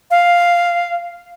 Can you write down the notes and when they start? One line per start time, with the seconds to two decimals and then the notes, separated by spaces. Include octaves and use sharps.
0.11 F5